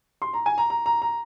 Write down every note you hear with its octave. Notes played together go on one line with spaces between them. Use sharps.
C6
A#5
G#5
A#5
A#5
A#5
A#5